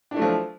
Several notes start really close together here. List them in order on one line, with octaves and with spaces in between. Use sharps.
D4 E4 A3 F#3 F3